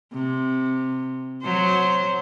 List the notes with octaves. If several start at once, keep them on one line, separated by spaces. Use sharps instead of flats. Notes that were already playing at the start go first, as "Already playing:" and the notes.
C3
F#3 C5